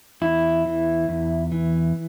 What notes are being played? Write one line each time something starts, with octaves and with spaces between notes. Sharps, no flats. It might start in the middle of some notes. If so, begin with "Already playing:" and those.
E2 E4
E3
E2
E3